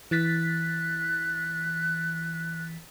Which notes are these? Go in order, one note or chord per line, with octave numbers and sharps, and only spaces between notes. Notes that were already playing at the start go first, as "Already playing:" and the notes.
E3 F#6 A6 B6